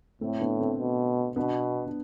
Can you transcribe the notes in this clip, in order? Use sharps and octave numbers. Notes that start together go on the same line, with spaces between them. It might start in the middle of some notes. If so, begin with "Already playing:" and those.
A2 A3 C4
B3 D4
A3 C4
B2
B2 B3 D4
D4